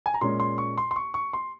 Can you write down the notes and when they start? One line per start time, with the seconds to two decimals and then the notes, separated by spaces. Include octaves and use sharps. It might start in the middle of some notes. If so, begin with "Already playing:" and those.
0.06 G#5
0.14 A#5
0.21 A#2 G#3 C#4 C6
0.40 C6
0.58 C#6
0.78 C6
0.91 C6
0.96 C#6
1.14 C#6
1.33 C6